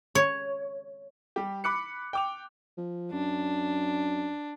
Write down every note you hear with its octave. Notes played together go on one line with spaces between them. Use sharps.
C#5
G3 G4
B5 D6 F#6 C#7
G5 D6 F7
F3
F#2 D4